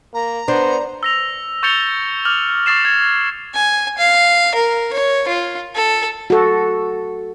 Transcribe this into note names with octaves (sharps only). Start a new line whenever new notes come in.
A#3 A#5
B3 D4 C5
E6 A#6 F7
C#6 G6 A6 C#7 F7 G7
D6 F6 G6 F7 F#7
C#6 D#6 A6 C7 E7
G#6
G#5
F5
A#4
C#5
F4
A4
F#4 A4